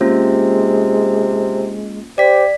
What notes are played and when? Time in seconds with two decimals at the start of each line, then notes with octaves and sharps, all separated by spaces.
0.01 C3 G#3 A#3 C#4 F4
2.18 G4 C5 D5 B6